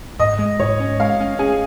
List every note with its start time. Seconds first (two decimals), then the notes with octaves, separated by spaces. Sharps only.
0.19 G#2 D#5
0.39 G#3
0.59 G#2 C#5
0.80 C#4
1.00 G#3 F5
1.20 C#4
1.39 C#4 G#4